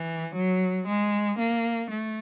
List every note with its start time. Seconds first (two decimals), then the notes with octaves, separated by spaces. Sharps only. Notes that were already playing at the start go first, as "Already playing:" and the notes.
Already playing: E3
0.35 F#3
0.87 G#3
1.38 A#3
1.90 A3